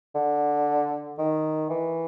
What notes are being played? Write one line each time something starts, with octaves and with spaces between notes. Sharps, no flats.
D3
D#3
E3